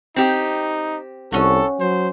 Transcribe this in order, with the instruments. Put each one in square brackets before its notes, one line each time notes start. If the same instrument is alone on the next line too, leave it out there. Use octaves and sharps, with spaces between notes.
[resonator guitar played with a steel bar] C4 G4 [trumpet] D#4
[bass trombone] C2 [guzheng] C#4 F#4 [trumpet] A4
[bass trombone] F#3 [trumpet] C5